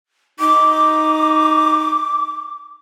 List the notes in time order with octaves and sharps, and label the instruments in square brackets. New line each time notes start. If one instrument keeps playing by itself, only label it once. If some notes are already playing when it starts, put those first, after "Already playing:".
[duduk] D#4 [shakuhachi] D6